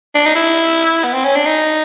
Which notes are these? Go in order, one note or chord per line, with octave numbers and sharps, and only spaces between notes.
D4
D#4
E4
B3
C4
C#4
D4
D#4